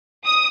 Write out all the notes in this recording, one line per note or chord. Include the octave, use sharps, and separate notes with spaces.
D#6